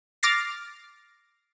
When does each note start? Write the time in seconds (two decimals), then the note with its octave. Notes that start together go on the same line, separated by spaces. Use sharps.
0.23 D6 F6 A6 A#6 C7